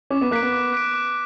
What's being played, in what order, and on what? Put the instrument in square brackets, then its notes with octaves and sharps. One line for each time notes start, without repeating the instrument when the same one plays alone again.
[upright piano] C#4 [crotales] D6
[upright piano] B3
[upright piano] A#3 [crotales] F#6 B6 D7
[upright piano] B3
[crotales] D6
F#6 B6 D7
D6